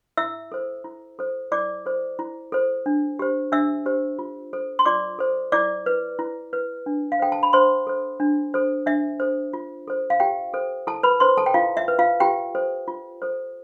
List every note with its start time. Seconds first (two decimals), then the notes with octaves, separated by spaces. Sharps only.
0.17 E4 E5 E6
0.52 A4 C5
0.84 E4
1.19 A4 C5
1.52 E4 D5 D6
1.86 A4 C5
2.19 E4
2.52 A4 C5
2.86 D4
3.19 G4 C5
3.52 D4 E5 E6
3.86 G4 C5
4.19 F4
4.53 A4 C5
4.79 C6
4.86 F4 D5 D6
5.19 A4 C5
5.52 E4 D5 D6
5.86 B4
6.19 E4
6.53 B4
6.86 D4
7.12 F5
7.19 A4 C5 G5
7.32 A5
7.43 B5
7.53 D4 C5 C6
7.87 A4 C5
8.20 D4
8.54 A4 C5
8.86 D4 E5
9.20 A4 C5
9.53 F4
9.88 A4 C5
10.10 F5
10.20 F4 G4 G5
10.54 A4 C5
10.87 E4 A4 A5
11.03 B4 B5
11.20 B4 C5 C6
11.38 A4 A5
11.46 G5
11.54 E4 F4 F5
11.77 E5
11.88 B4
11.99 F4 F5
12.20 F4 G4 G5
12.55 A4 C5
12.87 F4
13.22 A4 C5